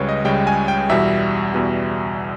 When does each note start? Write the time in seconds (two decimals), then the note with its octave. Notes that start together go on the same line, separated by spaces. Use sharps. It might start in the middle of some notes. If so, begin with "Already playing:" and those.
Already playing: C#2 C#3 G3 B4 C#5
0.09 D#5
0.25 C#2 C#3 G3 G5
0.47 G#5
0.68 G5
0.89 E2 B2 G3 E5
1.54 E2 B2 G3